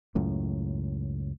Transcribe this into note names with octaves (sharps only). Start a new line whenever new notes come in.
C#2 F#2 A2